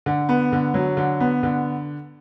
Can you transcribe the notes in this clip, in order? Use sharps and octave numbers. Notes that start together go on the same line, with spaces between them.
D3
B3
D3
F#3
D3
B3
D3